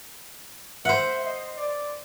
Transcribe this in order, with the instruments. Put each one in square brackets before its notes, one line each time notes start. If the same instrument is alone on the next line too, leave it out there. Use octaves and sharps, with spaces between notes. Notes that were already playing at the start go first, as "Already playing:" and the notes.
[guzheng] C5 F#5 [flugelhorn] E5
[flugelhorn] D#5
D5